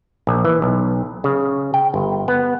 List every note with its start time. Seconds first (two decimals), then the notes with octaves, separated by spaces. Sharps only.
0.27 A#1
0.45 E3
0.62 B1
1.24 C#3
1.74 G5
1.94 G1
2.28 B3